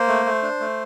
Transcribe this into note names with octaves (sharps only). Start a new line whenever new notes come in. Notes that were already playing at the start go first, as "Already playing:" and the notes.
Already playing: A#3 C5
A3
A3
D4
A3